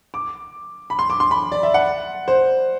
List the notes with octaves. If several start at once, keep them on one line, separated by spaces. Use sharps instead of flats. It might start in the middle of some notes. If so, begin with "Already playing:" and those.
D6
B5
C6
D6
C6
B5
D5
E5
F#5
C5